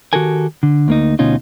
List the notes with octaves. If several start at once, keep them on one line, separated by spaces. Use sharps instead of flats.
D#3 F#4 G4 A4 A#4 G#5
D3
D2 A#3 D#4
D2 B2 C#4 D#4 F4